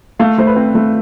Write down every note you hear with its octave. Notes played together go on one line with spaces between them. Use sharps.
A3 F5
A3 C5
B4
C4
A3